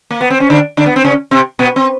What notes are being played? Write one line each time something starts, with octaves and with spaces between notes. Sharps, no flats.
A#3
B3
C4
C#4
D3 D4
D3 D4
B3
C4
C#3 C#4
C3 C4
B2 B3
C4